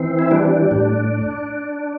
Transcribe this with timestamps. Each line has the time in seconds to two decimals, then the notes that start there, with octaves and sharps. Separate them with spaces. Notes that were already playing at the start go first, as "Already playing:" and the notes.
Already playing: E3 C4
0.19 E4
0.31 G3 D4
0.71 A2